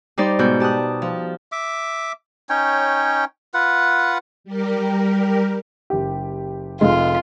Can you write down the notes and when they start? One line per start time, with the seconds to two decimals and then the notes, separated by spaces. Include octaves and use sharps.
0.18 G3 D#4 C5 D5
0.39 G#2 B2 F#4 G6
0.60 G4 A5 D#6 F#6
1.02 F3
1.52 E5 D6
2.49 C#4 D#4 C#5 G5
3.54 F4 B4 F#5
4.44 G3 G4 A#4
5.90 F#1 G4
6.81 F1 G#3 F4